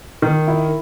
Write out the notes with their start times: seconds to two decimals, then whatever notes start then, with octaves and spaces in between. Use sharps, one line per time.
0.22 D#3
0.48 E4